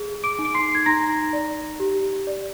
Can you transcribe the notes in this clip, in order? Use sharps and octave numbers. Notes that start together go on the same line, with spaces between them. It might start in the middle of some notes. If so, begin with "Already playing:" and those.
Already playing: G#4
D6 D7
D#4
D7
C6 C7
G#6
D#4 A#5 A#6
D5
G4
D5